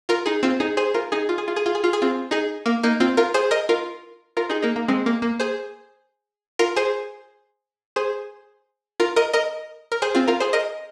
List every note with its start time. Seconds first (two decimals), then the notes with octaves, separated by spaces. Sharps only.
0.09 F4 A#4
0.26 D#4 G#4
0.43 C4 F4
0.60 D#4 G#4
0.77 G#4 C5
0.94 F4 A#4
1.12 D#4 G#4
1.29 F4
1.38 G#4
1.48 F4
1.56 G#4
1.66 F4
1.75 G#4
1.84 F4
1.93 G#4
2.02 C4 F4
2.31 D#4 G#4
2.66 A#3
2.83 A#3 D#4
3.00 C4 F4
3.17 F4 A#4
3.34 G#4 C5
3.51 A#4 D#5
3.69 F4 A#4
4.37 F4 A#4
4.49 D#4 G#4
4.62 A#3 D#4
4.76 A#3
4.88 G#3 C4
5.06 A#3
5.22 A#3
5.40 G#4 C5
6.59 F4 A#4
6.76 G#4 C5
7.96 G#4 C5
9.00 F4 A#4
9.16 A#4 D#5
9.33 A#4 D#5
9.92 A#4
10.02 G#4 C5
10.15 C4 F4
10.28 F4 A#4
10.40 G#4 C5
10.53 A#4 D#5